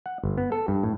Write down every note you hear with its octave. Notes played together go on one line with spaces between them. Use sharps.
F#5
G1
B3
A4
G2
A2